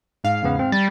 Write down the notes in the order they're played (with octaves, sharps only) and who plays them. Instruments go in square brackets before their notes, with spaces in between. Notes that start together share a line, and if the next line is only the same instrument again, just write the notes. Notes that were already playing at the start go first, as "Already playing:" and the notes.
[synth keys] G#2 F5
[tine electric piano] E2 C#3 B3
C4
[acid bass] G3 [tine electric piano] A6